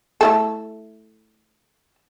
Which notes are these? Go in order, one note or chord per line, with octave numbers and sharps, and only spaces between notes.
A3 E4 A4